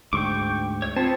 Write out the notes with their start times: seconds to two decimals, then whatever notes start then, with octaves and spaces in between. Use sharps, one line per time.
0.13 D2 G#2 G5 C#6 D6
0.82 C#5
0.96 B3 C4 F4 A5